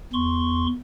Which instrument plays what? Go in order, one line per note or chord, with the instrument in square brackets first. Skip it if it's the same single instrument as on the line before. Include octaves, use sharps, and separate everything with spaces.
[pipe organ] E2 C6 C#6